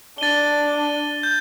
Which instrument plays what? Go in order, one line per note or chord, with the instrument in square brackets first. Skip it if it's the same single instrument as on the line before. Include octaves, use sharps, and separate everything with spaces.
[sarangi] D4 [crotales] A6 D#7 G7
[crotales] G6